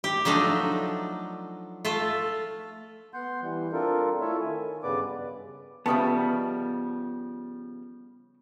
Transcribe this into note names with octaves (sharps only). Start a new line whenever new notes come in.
G4
F3 F#3 A3 D4 D#4
A3 F4 A4
B3 F#5 C6 G6
E3 G3
C4 D4 F4 A4 A#4
A3 E4 F4 A4 C#5 E5
D#3 G#5
G2 C#3 B3 B4 D5 D6
C#3 F3 G3 B3 A4 D#5 E5